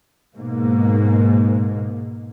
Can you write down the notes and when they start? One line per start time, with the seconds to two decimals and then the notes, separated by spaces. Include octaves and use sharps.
0.37 G#2 B2 A#3